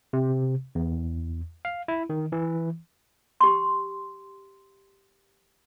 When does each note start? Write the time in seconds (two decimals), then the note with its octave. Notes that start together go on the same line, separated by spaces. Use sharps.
0.13 C3
0.75 E2
1.65 F5
1.88 E4
2.10 D#3
2.32 E3
3.41 G4 C6